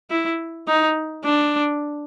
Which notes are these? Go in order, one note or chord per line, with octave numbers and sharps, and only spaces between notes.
E4
D#4
D4